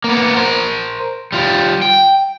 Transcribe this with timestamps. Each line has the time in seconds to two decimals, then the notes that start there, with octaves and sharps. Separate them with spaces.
0.04 A#3 B3
0.36 A#4 C5
1.32 G3 F4
1.82 G5